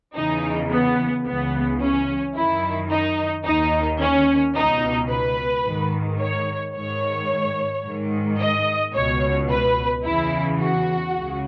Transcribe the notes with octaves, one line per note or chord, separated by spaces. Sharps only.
E2 C#3 E3 D#4
B3
C#2 C#3 E3 B3
C#4
F#2 D#3 E4
D#4
D#2 D#3 D#4
C#4
C#2 B2 D#4
B4
G#2 D#3
C#5
G#2 D#3 C#5
G#2 D#3
D#5
C#2 B2 C#5
B4
E2 C#3 E3 E4
F#4
C#2 C#3